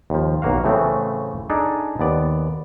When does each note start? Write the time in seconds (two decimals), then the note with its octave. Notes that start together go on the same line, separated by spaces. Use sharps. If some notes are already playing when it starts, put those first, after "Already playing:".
0.10 D#2 F3
0.42 B1 A#3 F#4 F5
0.64 A2 C#3 E3 A3 C4
1.50 D4 D#4 G#4 A4
1.99 D#2 B3 D5